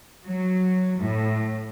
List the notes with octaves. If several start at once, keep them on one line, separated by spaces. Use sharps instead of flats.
F#3
A2